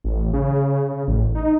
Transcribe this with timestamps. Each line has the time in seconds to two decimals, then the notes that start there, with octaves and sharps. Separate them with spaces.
0.04 A1
0.34 C#3
1.08 A1
1.35 D#4